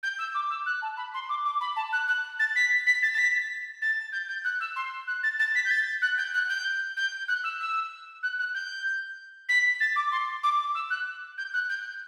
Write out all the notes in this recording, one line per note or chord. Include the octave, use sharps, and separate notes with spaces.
G6
E6
D6
E6
F#6
A5
B5
C6
D6
D6
B5
A5
F#6
F#6
A6
B6
B6
A6
A6
B6
A6
G6
G6
F#6
E6
C6
F#6
A6
A6
B6
G6
A6
F#6
G6
F#6
G6
G6
F#6
E6
E6
F#6
F#6
G6
B6
A6
D6
C6
D6
E6
F#6
G6
F#6
G6